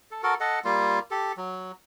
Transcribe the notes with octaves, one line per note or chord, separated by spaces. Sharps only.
A4
F#4 A4 A#4
A4 D#5 F#5
G3 A#3 F4
G4 A4
F#3